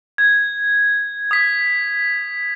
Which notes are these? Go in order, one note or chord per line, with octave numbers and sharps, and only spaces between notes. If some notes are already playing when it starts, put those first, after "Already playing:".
G#6
D#6 B6